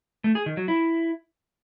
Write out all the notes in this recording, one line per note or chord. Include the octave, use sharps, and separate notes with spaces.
A3
G#4
D#3
F#3
E4